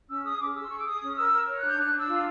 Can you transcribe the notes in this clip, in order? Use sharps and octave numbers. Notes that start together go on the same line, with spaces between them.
C#4 E6
G#4 D#6
C#4 D6
G#4 E6
C6
G#4 C#6
D6
G#4 D#6
C#4
A#4 E6
A#4
C#5
F#6
D4
G6
D4 F#6
D4 E6
F4